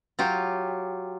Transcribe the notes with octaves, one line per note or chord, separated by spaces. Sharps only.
F#3 F4 G4